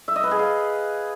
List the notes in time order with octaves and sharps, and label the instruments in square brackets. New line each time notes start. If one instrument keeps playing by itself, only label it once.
[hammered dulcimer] E5
D#5
B4
G#4
F5